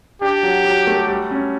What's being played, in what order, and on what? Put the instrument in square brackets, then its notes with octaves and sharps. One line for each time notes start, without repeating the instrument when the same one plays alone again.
[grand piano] D4 [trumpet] G4
[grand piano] F#3
F#3
A3
G3
C#4